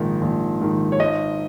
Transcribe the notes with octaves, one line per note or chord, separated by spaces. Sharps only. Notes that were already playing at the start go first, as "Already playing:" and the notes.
Already playing: A#1 G#2 D#3
A#1
G#2 D#3
C#5
G#1 D#5